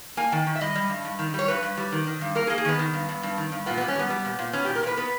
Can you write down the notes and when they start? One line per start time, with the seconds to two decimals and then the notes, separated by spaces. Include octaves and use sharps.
0.17 A#3 G#5
0.32 D#3 G5
0.47 D#3
0.55 E5
0.61 G3 D#5
0.75 G3
0.90 G2
1.05 G2
1.19 D#3
1.34 G3 C#5
1.48 G2 B4
1.63 G2
1.77 G3
1.92 D#3
2.07 D#3
2.21 G2
2.35 A#3 A#4
2.47 G#4
2.50 A#3
2.58 G#4
2.65 D#3 B3
2.79 D#3
2.94 G2
3.09 G2
3.23 G2
3.37 D#3
3.52 G2
3.66 A#2 B3
3.78 G3 B3
3.88 C#4
3.96 G3 B3
4.10 G3
4.25 A#2
4.39 A#2
4.53 B3 C#4
4.65 A#2 G4
4.75 A#4
4.83 A#2 B4
4.97 B3 B4